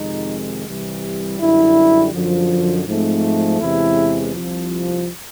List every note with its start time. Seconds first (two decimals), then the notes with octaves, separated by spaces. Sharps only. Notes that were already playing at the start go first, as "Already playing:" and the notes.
Already playing: F2 C3 D#3 G#3 D#4
0.66 C2 C3 E3 G3
1.40 F#2 D3 G3 E4
2.13 F#2 D3 F3
2.87 G#2 F3 A3 C4
3.61 E2 C3 E3 G#3 E4
4.35 C2 C3 F3